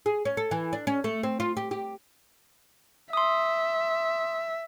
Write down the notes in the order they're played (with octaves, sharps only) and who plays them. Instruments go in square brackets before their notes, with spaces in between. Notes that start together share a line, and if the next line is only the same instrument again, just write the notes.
[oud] G#4
C#4
A4
E3
D4
C#4
A3
C4
F4
G4
G4
[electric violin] E5 [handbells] C6 D#6